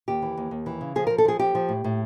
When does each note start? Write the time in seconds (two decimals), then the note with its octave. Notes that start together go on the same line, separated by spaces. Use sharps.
0.08 D#2 G4
0.22 E3
0.37 D#2
0.51 D#2
0.66 E3
0.81 C#3
0.95 F3 G#4
1.07 A#4
1.10 F3
1.18 A4
1.25 F3 G#4
1.39 F3 G4
1.55 F3
1.69 A2
1.84 A2